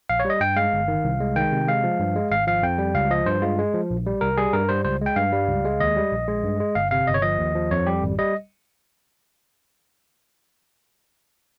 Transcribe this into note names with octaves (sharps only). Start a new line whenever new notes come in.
A#1 F5
C#5
G3 D#5
G2 G5
G#3 F5
G1
D#3
C2
G#3
D#3 G5
C3
G#3 F5
F3
G2
G#3
G#1 F5
F3 F5
F2 G5
G3
C#2 F5
F3 D#5
G2 C5
G#3 F4
G#3
F3
A#1
G3
C2 A#4
G3 G#4
G2 A#4
G3 C5
C#2 C5
G#3 G5
G2 F5
G3
C#2
G#3
D#2 D#5
G3
A#1
G#3
G2
G#3
G1 F5
C3 F5
G1 D#5
C#5
F3 D#5
D#2
F3
F2 C#5
G3 G4
G#1
G3 D#5